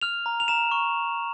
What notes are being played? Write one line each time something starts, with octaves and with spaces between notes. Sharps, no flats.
F6 F7
A#5
F7
A#5 E7
C#6